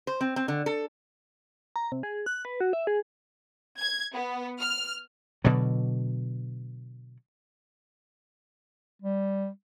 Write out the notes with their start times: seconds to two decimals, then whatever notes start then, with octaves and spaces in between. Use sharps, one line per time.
0.07 C5
0.21 C4
0.36 C4
0.48 D3
0.66 A4
1.76 A#5
1.92 C3
2.03 G#4
2.26 F#6
2.45 B4
2.61 F#4
2.73 E5
2.87 G#4
3.78 G#6
4.13 B3
4.59 F6
5.44 B2 D3 F#3
9.02 G3